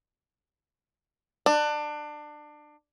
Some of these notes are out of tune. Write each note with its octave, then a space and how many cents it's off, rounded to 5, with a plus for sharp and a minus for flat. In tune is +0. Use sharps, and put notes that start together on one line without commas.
D4 +25